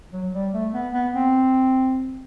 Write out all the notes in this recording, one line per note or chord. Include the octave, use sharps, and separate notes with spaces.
F#3
G3
A3
B3
B3
C4